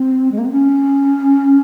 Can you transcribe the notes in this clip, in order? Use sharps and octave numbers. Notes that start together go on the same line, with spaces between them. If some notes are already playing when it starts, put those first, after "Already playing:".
Already playing: C4
G#3
A#3
C4
C#4